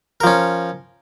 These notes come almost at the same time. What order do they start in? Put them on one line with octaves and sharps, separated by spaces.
A#4 F3 C#4